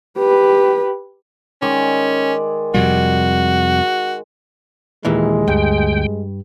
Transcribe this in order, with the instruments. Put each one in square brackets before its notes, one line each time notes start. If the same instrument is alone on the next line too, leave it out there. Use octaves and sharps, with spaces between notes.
[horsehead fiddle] G4 B4
[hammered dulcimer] D#3 G#3 D5 [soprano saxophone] C#4
[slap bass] F2 C3 G3 [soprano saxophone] F#4
[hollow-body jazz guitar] D#2 A#2 E3 [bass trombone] G#3
[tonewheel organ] D2 G5 [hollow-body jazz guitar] G2